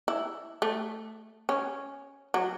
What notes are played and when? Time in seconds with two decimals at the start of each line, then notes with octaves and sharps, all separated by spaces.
0.08 E4
0.62 A3
1.49 C#4
2.34 F#3